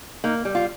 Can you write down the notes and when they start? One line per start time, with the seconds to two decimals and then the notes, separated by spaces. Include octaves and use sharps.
0.24 A#3 D#4
0.45 G3
0.55 F4